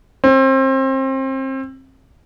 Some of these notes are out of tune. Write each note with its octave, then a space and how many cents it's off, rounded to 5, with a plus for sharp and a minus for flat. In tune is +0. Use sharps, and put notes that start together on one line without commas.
C4 +30